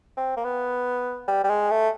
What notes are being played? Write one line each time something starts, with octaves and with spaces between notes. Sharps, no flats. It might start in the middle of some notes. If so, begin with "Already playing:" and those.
C4
A#3
B3
G3
G3
G#3
A3